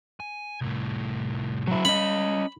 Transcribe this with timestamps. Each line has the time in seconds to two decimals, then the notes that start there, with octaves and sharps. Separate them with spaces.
0.20 G#5
0.61 C2 A2
1.67 F#3 E4
1.85 G3 C#4 D#5 B5